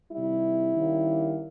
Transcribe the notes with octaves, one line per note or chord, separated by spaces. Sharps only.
C3 D#3 G3 E4
D#3 G3 A#3 C#4